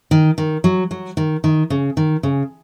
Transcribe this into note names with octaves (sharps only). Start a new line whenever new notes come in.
D#3
D#3
F#3
F#3
D#3
D#3
C#3
D#3
C#3